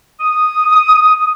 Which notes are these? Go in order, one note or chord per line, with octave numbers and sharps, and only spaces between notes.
D#6